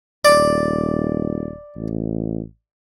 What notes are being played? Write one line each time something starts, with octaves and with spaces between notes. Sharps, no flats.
D#1 D5
A1